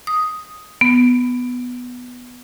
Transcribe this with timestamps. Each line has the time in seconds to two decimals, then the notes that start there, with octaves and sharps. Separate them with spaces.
0.07 D#6
0.81 B3